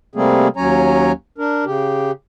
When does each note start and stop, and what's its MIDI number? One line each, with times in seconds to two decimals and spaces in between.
0.15 0.48 48
0.15 0.48 55
0.15 0.48 57
0.15 0.48 58
0.15 0.48 60
0.15 0.48 68
0.57 1.12 39
0.57 1.12 54
0.57 1.12 61
0.57 1.12 73
0.57 1.12 80
0.57 1.12 82
1.38 1.65 62
1.38 1.65 70
1.65 2.11 49
1.65 2.11 67